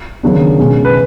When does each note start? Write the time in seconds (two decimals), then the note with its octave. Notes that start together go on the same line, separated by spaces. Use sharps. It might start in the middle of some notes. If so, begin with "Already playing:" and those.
0.23 D#2 C#3 F#3 B3 D4
0.59 B2 G#3 C#4
0.85 B4